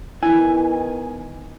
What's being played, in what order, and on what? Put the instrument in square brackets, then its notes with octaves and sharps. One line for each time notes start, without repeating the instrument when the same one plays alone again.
[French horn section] D#3 B3 B4 [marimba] E4 [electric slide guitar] G#5